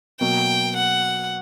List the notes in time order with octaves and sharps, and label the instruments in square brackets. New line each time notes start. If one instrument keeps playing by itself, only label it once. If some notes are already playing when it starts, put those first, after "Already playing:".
[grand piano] B2 F#3 A#3 [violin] G5
[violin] F#5